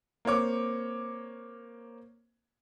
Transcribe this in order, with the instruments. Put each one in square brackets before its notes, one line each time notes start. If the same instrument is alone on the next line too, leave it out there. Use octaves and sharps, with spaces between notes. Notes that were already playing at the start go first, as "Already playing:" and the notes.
[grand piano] A#3 C4 C#5 D6